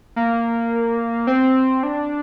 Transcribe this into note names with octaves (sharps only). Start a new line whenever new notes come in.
A#3
C4
D4